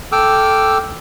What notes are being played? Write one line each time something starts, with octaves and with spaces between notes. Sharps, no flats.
A4 G5 D6 E6 F6